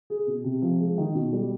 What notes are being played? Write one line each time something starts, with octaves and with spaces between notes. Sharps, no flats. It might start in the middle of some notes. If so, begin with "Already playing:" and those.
G#4
B2
C3
F3
G#3
D#3
B2
G3